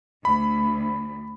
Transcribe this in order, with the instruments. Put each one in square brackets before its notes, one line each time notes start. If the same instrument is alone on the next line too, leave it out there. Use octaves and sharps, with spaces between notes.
[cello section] D2 [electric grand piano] B5